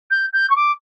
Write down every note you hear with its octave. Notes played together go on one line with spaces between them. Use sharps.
G6
G6
C#6
D6